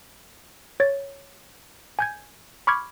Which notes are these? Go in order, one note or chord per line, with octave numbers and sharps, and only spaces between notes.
C#5 A6
G#5 G6 G#6
B5 C#6 D6 F6 G#6